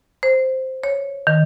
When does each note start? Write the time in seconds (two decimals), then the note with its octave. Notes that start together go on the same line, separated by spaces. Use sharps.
0.23 C5
0.84 C#5
1.27 D#3